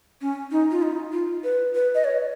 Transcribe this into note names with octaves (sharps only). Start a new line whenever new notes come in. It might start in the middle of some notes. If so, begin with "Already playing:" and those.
C#4
D#4
F4
D#4
F4
B4
B4
D#5
C#5